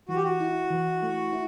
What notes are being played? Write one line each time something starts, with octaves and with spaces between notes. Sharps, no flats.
E3 F#4
G4
F#4
E4
E3
A3
E4